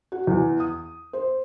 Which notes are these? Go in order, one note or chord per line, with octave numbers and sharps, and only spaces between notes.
F#4
E2
D#6
C5